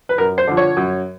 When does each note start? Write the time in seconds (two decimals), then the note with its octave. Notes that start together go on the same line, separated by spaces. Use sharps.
0.09 B4
0.18 F#2 A#4
0.38 C5
0.47 D3 F3
0.57 C#5
0.77 F#2